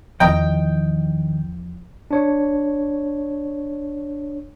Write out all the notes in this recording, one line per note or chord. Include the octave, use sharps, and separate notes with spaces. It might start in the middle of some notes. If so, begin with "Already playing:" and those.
E2 D#3 F3 D#5 G5 A#5
D4 C#5